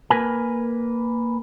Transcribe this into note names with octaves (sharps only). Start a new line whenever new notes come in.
A#3 A#4 B4 G#5